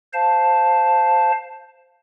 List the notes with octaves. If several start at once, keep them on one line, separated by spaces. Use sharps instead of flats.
C5 F5 A5